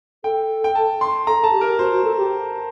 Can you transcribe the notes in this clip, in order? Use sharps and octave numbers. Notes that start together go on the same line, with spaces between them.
A4 G5
G5
A5
C6
A4 A#5
A4 A5
G4
A#4
F#4 C5
F#4
A4
G4